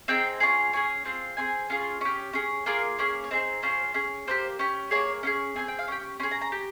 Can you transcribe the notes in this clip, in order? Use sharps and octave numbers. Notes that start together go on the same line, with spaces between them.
C4 D#4 G#4 G5
C#4 F4 G#4
C#4 F4 G#4 G#5
C4 F4 G#4
C4 F4 G#4 G#5
C#4 F4 G#4
C#4 G4
C#4 G#4
A#3 F4 G#4 A#4
A#3 C#4 G#4
C#5
C4 D#4 G#4 C5
C#4 F4 G#4 C5
C#4 G#4
A#3 D#4 G4 C5
C#4 G4
A#3 D#4 G#4 C#5
C#4 F4 G#4
C4 D#4 G#4 G#5
G5
F5
C#4 G4 G5
C#4 G#4 C6
A#5
A#5
G4